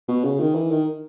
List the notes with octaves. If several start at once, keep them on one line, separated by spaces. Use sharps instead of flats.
B2
C#3
D#3
E3
D#3